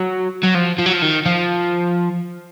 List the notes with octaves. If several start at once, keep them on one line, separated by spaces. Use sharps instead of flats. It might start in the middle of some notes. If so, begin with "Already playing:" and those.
Already playing: F#3
F#3
F3
F3
F#3
F3
D#3
F3